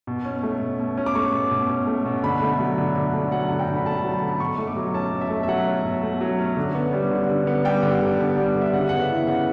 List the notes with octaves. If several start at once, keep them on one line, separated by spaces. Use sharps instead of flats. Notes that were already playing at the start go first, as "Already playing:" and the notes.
B2
C#4
A3
B2
B2
C#4
D6
A3 C#6
B2
B2
C#4
A3
B2
D3 B5
A3
F#3
D3
D3
A3
F#3 F#5
D3
G5
D3
B5
A3 A5
F#3
B5
D3
B2 C#6
A3
D6
F#3
C#4 A5
B2
E5
A3
E5
F#3 F#5
C#4
B2
A3
F#3
C#4
D3
B3
G3
D3
D3
B3
G3 G5
D3
D3
B3
G3
D3
E5
C#3 F#5
B3 F#5
E5
E3
C#3 F#5